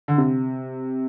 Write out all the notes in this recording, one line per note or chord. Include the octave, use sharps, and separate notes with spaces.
D3
C3